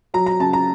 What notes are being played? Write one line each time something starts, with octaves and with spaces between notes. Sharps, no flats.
F#3 A#5
A#5
C#3 A5
A#5